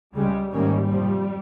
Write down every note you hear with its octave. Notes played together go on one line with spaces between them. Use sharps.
C#2 C#3 G3 G#3 C#4
G#2 D#3 G3 A#3 C#4
F2 C3 F3